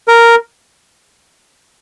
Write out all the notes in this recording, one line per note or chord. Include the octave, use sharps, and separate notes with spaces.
A#4